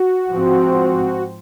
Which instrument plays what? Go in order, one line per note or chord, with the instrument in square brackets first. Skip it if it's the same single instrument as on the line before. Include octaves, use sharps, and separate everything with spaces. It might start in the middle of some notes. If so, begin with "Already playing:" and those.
Already playing: [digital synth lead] F#4
[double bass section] G#2 F3 C4